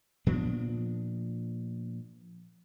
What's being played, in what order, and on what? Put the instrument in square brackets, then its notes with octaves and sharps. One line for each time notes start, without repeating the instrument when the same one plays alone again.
[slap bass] A#2 F3 B3 D4